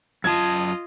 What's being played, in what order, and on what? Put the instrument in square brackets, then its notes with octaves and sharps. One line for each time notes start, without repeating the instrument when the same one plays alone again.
[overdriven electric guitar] F#2 A5 [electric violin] F4 D#5 [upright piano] G#6